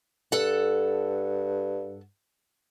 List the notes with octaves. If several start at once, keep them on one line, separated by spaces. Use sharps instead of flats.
G2 A4 F#5